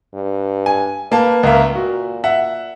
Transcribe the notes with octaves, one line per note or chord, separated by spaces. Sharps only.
G2
G#5
A#3 B4 A5
C#2 A#3 E5
A#2 F#4
E5 F#5